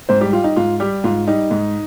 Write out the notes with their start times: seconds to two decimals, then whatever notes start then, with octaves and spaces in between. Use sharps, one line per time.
0.09 G#2 C4 C5
0.21 G3 G4
0.32 G3 F4
0.44 D#4
0.56 G#2 F4
0.80 G3 G4
1.04 G#2 F4
1.28 G3 D#4
1.51 G#2